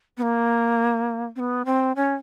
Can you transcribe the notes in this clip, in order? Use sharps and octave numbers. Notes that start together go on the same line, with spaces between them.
B3
A#3
C4
B3
C4
C#4